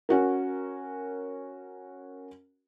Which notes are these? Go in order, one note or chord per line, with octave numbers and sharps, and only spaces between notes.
C#4 F#4 A#4